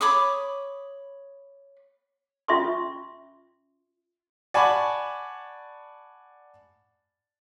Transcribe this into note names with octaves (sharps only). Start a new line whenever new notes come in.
C#5 B5 D6 D#6
C#4 F4 E5 C6 C#6
D5 F#5 G#5 A5 B5 C#6